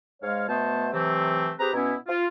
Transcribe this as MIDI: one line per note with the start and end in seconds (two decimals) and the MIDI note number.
0.23 0.45 44
0.23 0.45 56
0.23 0.45 73
0.23 0.45 77
0.49 0.88 47
0.49 0.88 57
0.49 0.88 59
0.49 0.88 72
0.49 0.88 81
0.92 1.51 48
0.92 1.51 52
0.92 1.51 54
0.92 1.51 57
0.92 1.51 60
1.59 1.70 60
1.59 1.70 67
1.59 1.70 68
1.59 1.70 71
1.59 1.70 82
1.73 1.94 47
1.73 1.94 59
1.73 1.94 61
1.73 1.94 64
2.08 2.26 65